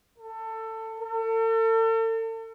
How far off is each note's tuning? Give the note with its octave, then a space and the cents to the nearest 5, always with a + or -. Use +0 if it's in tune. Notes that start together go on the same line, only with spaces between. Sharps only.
A4 +20
A4 +40